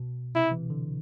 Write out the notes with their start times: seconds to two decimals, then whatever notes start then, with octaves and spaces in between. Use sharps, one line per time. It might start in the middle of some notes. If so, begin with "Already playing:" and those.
Already playing: B2
0.35 C3 E4
0.52 E3
0.70 D3